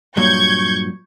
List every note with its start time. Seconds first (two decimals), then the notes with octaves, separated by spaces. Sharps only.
0.17 G2 A#2 F#3 C#6 G6 G#6